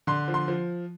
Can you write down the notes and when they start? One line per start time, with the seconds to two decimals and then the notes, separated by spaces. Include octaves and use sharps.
0.07 D3 C6
0.28 F3
0.34 C6
0.48 F3